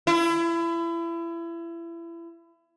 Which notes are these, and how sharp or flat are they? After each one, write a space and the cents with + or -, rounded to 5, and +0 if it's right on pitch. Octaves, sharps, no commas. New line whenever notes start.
E4 +30